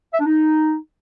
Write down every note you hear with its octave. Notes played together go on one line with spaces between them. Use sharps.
E5
D4
D#4